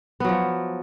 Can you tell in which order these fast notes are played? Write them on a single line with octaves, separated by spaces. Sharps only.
B3 F#3 F3